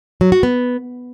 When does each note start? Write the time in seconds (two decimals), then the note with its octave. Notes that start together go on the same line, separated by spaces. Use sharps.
0.21 F#3
0.32 F#4
0.43 B3